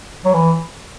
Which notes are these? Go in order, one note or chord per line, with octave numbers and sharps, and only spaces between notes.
F#3
E3